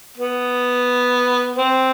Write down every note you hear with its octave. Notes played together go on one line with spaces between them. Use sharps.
B3
C4